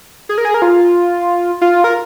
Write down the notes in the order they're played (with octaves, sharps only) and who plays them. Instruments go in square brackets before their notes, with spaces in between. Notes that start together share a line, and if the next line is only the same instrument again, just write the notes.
[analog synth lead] G#4
A#4
G#4
A#4
F4
F4
A#4